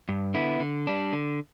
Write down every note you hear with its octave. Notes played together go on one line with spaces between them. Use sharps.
G2
D3 B3 E4
D3
G3 D4
D3